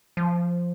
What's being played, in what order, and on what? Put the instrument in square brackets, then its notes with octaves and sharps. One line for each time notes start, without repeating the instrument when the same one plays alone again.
[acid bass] F3